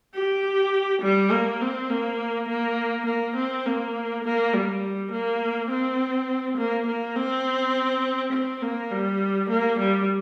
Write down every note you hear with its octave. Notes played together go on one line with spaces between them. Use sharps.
G4
G3
A#3
C4
A#3
A#3
A#3
C4
A#3
A#3
G3
A#3
C4
A#3
A#3
C4
C4
A#3
G3
A#3
G3